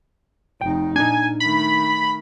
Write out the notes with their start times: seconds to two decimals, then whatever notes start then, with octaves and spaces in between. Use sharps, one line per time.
0.61 F1 D#4 G5
0.96 A#2 D4 D#4 G#5
1.40 D#3 A3 B5